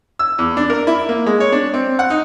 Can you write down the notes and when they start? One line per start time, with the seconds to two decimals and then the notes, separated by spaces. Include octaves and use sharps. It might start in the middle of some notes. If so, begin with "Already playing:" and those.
0.19 E6
0.38 E2
0.57 D4
0.70 A#4
0.87 E4
1.09 A#3
1.26 G#3
1.40 C#5
1.52 D4
1.74 C4
1.99 F#5
2.10 D#4